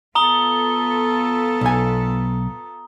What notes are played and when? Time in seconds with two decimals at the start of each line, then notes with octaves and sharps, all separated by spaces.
0.15 B3 F4 A4 A#5 D#6 G7
1.61 B1 G#5